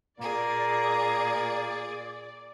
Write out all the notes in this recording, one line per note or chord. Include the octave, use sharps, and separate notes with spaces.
A#2 A#3 G#4 D5